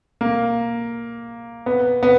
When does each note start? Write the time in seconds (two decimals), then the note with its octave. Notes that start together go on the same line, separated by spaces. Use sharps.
0.21 A#3
1.66 B3
2.03 B3